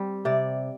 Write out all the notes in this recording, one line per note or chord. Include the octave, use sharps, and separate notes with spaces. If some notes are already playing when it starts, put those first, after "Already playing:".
Already playing: G3 C4
C3 D5